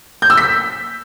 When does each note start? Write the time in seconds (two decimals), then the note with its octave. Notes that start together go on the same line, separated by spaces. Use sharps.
0.22 G6
0.30 E6
0.37 B6